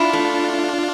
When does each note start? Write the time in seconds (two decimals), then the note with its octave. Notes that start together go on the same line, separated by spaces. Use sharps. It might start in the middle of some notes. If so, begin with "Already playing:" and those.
Already playing: D4 E4 F4
0.13 A3